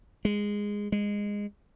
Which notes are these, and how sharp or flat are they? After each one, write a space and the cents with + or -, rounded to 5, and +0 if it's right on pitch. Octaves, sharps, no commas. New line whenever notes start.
G#3 -10
G#3 -15